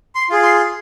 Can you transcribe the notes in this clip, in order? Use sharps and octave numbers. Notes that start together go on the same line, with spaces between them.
C6
F4 G#4
C6